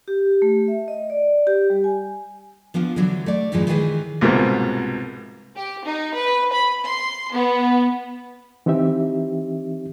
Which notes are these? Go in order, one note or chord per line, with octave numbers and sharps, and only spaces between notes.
G4
A3
E5
D#5
D5
G4
G3
G#5
F3 B3 D4 F4
D3 E3 F#3 D4
A3 D5
F#2 A2 E3 F3 G#3
D#3 E3 G#3 G#4 B4 C5
C2 G#2 B2 F3 A#3
G4
D#4
B4
B5
C6
B3
E3 C4 D#4 G4 E5